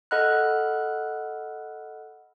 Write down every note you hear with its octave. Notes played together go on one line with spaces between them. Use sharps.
A4 D#5 F#5 B5 F6 F#6